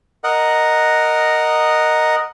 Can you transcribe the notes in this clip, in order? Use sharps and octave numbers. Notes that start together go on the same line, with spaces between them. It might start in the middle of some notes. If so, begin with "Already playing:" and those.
A#4 D#5 F#5